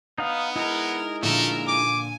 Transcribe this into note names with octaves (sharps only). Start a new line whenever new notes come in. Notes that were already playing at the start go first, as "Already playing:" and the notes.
B3 D#4 F5
G#3 D#4 E4 A#4
A#2 D3 F3 A3 A#4 E5
G#5 D6